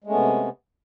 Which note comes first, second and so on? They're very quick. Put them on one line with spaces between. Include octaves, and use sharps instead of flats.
G#3 A3 C#4 B3 C3